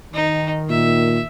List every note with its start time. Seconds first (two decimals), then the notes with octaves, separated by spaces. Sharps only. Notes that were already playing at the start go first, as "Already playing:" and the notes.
0.14 D#3 D#4
0.70 A#2 E5